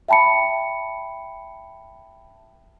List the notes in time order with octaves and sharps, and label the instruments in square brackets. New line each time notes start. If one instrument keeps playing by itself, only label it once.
[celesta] E5 G5 A5 B5 C#7